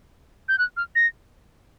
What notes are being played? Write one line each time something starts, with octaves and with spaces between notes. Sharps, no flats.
G6
F#6
F6
A#6